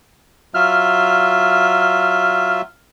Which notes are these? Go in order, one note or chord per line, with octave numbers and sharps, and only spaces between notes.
F#3 F4 E5 F6